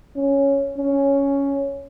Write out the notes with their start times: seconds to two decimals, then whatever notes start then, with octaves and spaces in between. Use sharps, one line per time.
0.16 C#4
0.78 C#4